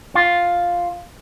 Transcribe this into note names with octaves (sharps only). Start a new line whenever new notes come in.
F4